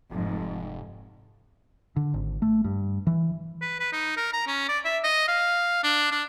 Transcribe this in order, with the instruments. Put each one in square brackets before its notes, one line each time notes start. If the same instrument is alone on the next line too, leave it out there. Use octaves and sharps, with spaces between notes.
[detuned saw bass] F1 [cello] F2 G#2
[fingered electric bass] D3
G#1
A3
G2
E3
[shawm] B4
B4
D#4
A#4
A#5
C#4
D5
E5
D#5
F5
D4
D4